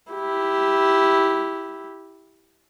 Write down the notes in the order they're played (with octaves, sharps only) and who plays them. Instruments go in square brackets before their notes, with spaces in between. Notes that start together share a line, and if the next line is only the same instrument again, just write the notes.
[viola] E4 G4